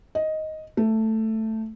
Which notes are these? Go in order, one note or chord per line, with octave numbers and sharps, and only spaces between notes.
D#5
A3